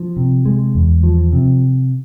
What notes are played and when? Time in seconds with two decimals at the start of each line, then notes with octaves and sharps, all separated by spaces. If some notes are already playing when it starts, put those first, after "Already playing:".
Already playing: F3
0.16 C3
0.45 G#3
0.75 E2
1.03 F3
1.33 C3